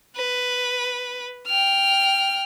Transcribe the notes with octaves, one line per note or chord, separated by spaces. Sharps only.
B4
G5 F6